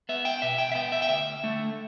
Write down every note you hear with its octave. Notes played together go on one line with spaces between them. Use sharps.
B3 E5
G5
B2 E5
G5
E5
B3 G5
E5
G5
D2 E5
D3 A3